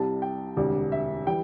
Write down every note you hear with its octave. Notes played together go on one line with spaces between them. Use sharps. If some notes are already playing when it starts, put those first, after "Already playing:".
Already playing: C2 C3 G3 A5
G5
E1 D2 C3 G3 D5
E5
E3 G3 G5